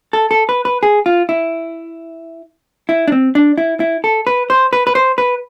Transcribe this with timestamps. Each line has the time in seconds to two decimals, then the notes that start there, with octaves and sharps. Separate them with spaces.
0.13 A4
0.31 A4
0.49 B4
0.65 B4
0.83 G#4
1.06 F4
1.29 E4
2.89 E4
3.08 D4
3.12 C4
3.35 D4
3.58 E4
3.80 E4
4.04 A4
4.27 B4
4.50 C5
4.73 B4
4.87 B4
4.95 C5
5.18 B4